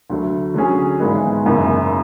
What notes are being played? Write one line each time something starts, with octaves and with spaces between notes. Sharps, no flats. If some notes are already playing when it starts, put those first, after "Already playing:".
D2 D3 F#3 A3
D3 F#3 C#4 G#4
G#1 G#2 E3 G#3 B3
F#1 F#2 C#3 E3